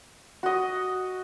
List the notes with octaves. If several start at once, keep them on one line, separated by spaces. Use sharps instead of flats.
F#4 D#5